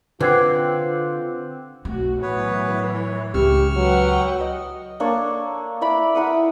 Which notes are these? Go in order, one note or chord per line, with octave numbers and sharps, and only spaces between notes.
D3 C4 F4 B4 F#5 D6 G#6 C7
B1 A3 F#4
A2 E3 F#3 B3 B4 C#5
C#5
C#2 G4 C#6 E6 F6
F#3 B4 F#5 G5
D#5
A#3 D4 A4 C#5
E4 D5 B5
E4 A#4 F#5 D#6